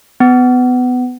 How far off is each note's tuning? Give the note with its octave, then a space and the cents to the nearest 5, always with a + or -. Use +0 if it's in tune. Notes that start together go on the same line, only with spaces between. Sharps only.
B3 +20